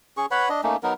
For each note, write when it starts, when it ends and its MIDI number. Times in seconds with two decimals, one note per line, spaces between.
0.17 0.26 61
0.17 0.26 68
0.17 0.26 85
0.31 0.49 71
0.31 0.49 73
0.31 0.49 78
0.31 0.49 83
0.49 0.61 62
0.49 0.61 75
0.64 0.76 57
0.64 0.76 58
0.64 0.76 61
0.64 0.76 63
0.83 0.94 54
0.83 0.94 59
0.83 0.94 63
0.83 0.94 70